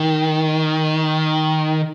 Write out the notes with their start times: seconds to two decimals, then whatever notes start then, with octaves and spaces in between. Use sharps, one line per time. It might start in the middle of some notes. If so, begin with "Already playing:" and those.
Already playing: D#3